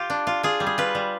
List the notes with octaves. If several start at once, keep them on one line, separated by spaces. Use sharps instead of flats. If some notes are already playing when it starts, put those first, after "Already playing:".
Already playing: F4 G4
D4
F4
F4 G#4
G3
G#4
F4 B4
G3